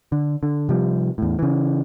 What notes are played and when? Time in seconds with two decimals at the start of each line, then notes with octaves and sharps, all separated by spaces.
0.12 D3
0.43 D3
0.69 C3 F3 G3
1.18 E2 A2
1.39 C#3 E3